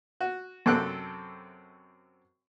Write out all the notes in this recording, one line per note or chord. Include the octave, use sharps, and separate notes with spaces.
F#4
F#2 C3 C4 A4 F#6